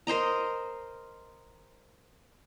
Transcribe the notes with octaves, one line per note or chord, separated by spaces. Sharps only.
A#4 C5 D#5 A#5